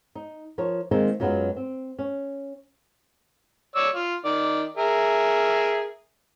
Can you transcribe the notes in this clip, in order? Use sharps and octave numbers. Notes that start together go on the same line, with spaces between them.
D#4
F3 A#4 C#5
D#3 G#3 A#3 C4
F#2 F#3 G#3 B3 F4
C4
C#4
C#5 D5 E6
F4
D#3 D5
G#4 A#4 E5